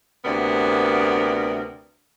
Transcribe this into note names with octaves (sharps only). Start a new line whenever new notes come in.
D2 C3 B3 A#4 D5